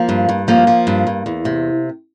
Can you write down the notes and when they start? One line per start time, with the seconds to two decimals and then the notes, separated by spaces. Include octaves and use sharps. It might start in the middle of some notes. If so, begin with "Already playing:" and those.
Already playing: F3 A#3
0.09 G2
0.29 G2
0.48 F3 A#3
0.67 F3
0.87 G2
1.07 G2
1.26 E2
1.45 C3